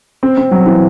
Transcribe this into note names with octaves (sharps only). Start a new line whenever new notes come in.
C4
C4
F#3
E3